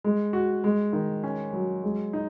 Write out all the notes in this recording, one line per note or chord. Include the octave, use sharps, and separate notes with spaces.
G#3
F#4
G#3
D#3
C#4
F#3
G#3
D#4